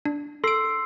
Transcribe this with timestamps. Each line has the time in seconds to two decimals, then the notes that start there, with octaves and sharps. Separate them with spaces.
0.05 D4
0.44 A4 C6 E6 C7 D7